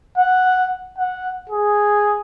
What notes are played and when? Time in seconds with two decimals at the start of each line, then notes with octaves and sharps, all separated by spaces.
0.18 F#5
0.98 F#5
1.49 G#4